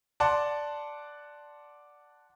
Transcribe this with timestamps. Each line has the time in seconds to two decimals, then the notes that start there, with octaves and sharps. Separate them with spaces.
0.20 D5 F#5 A5 C6